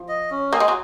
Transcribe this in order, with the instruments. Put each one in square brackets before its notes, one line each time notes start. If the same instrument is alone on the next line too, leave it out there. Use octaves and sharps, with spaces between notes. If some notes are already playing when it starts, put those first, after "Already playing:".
Already playing: [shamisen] F3
[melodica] D#5
C#4
[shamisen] A#3 [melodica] G#4
[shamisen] G#3
F#3